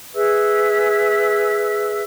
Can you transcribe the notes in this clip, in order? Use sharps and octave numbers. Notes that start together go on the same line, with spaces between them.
G#4 B4 E5 E6